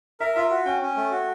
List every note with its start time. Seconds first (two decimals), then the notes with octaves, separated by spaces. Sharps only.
0.20 A#4 E5
0.36 F4 E5
0.50 F#4
0.66 C#4 G5
0.82 C#4
0.97 A3
1.11 F#4